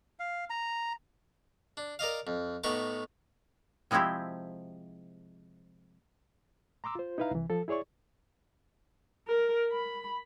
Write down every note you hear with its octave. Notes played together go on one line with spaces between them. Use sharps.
F5
A#5
D4
A#4 D5 D#5 F5
F2
A2 B3 D#4 C#6 D6
C3 F3 G#3 C4 E4 G4
A#5 C6 D6 E6
F4 C5
D#4 E4 B4 E5 F5 A#5
C2 E3
F3 A4
E4 G#4 C#5 D5 C#6
A#4
B5